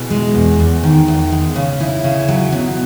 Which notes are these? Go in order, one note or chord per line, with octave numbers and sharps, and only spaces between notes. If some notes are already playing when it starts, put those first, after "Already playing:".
Already playing: B2 E4 G#4
G#3
E2
E2
D#3
E2
G#3
C#3
C#3 E4
C#3
F#3
B2